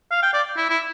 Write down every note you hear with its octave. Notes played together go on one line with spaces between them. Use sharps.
F5
G5
D5
E4
E4